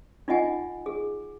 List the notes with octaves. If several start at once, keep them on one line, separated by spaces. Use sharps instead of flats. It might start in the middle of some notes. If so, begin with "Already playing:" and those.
D#4 F4 D#5 F#5 G#5
G#4